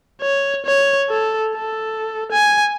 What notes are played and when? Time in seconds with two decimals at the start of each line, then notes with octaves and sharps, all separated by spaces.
0.22 C#5
0.65 C#5
1.10 A4
1.55 A4
2.32 G#5